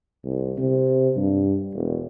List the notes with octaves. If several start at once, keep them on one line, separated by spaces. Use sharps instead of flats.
C2
C3
G2
E1